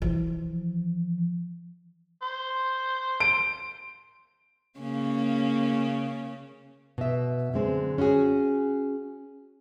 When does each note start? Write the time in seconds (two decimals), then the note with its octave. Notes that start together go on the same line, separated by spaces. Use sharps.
0.02 E3 F3
2.22 C5
3.20 D7
4.79 C#3 A#3 C#4
6.98 B2 E5
7.53 F#2 D3 G#3 C4
7.98 C#4 E4 F#4 G#4